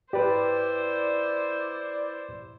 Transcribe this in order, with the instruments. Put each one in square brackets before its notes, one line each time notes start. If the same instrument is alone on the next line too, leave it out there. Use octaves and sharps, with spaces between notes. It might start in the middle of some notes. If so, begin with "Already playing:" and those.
[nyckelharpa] E4 C5 [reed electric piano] G4 B4 [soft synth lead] D5